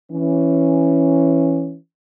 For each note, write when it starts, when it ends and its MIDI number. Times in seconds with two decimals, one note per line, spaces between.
0.10 1.75 52
0.10 1.75 61